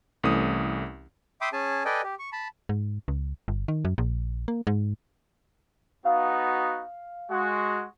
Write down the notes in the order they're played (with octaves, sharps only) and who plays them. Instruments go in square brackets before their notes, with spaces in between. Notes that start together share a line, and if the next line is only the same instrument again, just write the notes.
[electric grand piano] C2 E3 A3 C#4 D#6
[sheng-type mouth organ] E5 G5 B5 C6 D6 D#6
C#4 G#4 G#5 A5
A4 B4 D5 D#5 G5 G#5
G4
C#6
A5 B5
[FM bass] G#2
C#2
G1
D#3
F#2
A#1
A#3
G#2
[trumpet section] B3 D#4 F#4 [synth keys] F5
[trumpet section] G#3 F#4